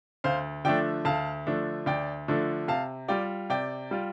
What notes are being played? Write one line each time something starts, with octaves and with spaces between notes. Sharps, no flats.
D2 C5 F5
D3 F3 A3 D4 D5 G5
D2 F5 A5
D3 F3 A3 D4
D2 D5 G5
D3 F3 A3 D4
C3 F5 A5
G3 F4 D5 G5
C3 D5 G5
G3 F4